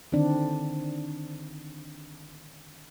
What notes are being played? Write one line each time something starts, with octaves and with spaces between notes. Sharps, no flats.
D3 D#3 C4 D4